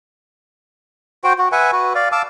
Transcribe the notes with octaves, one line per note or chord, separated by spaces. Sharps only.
F#4 C5 G5
F#4
B4 E5 F#5 G#5
F#4 B4
D5 F5
F5 A5 D6 E6